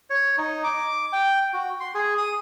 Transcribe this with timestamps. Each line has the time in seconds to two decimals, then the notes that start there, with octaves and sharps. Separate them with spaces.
0.10 C#5
0.38 D#4
0.64 D6
1.13 G5
1.54 F#4
1.80 C6
1.95 G#4
2.18 D#6